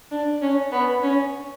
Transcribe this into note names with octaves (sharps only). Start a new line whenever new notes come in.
D4
C#4
B3
C#4